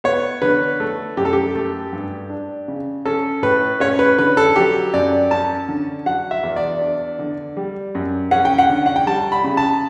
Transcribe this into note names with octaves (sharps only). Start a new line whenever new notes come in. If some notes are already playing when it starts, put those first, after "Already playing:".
B3 C#5
D3 B4
A3
F#2 G4
A4
G4
A3
G2
D4
C#3
C#4 A4
A2 B4
C#4 C#5
B4
D3 B4
A4
F#3 G4
F#2 D5
C#4 A5
D3
F#3 F#5
E5
E2
D5
D4
D3
G3
F#2
C#4 F#5
G5
F#5
D3
F#5
G5
G3 A5
B5
C#3
A5